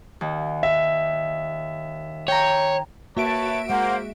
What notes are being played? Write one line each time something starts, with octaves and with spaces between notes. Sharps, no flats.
D#2
E5
C#5 G5 A#5
A#3 F#4 B4 C#5 E5 A5 D7
G#3 A#3 C5 F#5